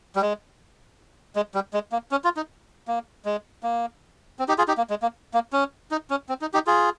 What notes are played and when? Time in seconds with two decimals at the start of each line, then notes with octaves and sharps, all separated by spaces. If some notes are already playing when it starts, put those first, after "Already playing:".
0.16 G3
0.22 G#3
1.36 G#3
1.54 G3
1.74 G#3
1.92 A#3
2.11 C#4
2.24 F4
2.37 D#4
2.88 A#3
3.25 G#3
3.63 A#3
4.39 C4
4.48 D#4 G4
4.58 F4 G#4
4.68 D#4 G4
4.77 A#3
4.90 G#3
5.02 A#3
5.34 A#3
5.53 C#4
5.91 D#4
6.10 C#4
6.29 C4
6.41 D#4
6.54 D#4 G4
6.67 F4 G#4